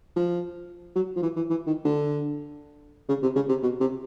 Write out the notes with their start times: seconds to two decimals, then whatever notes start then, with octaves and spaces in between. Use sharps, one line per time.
0.16 F3
0.95 F#3
1.16 F3
1.22 E3
1.36 E3
1.50 E3
1.67 D#3
1.85 D3
3.08 C#3
3.22 C3
3.36 C#3
3.49 C3
3.62 B2
3.80 C3